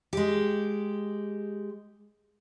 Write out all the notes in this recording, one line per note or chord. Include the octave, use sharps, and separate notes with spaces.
G#3 G4